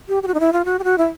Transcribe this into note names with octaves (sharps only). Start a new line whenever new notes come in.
G4
G4
F#4
D#4
E4
F4
F#4
G4
F#4
E4